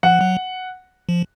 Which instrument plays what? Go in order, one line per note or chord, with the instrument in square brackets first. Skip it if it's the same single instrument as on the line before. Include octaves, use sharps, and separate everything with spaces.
[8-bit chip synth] F3 [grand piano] F#5
[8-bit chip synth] F#3
F3